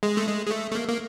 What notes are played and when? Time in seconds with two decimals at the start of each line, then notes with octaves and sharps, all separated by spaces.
0.03 G#3
0.17 A3
0.27 G#3
0.46 G#3
0.51 A3
0.71 A3
0.75 A#3
0.88 A#3